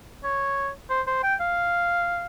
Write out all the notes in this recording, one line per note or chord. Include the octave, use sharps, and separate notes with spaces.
C#5
C5
C5
G5
F5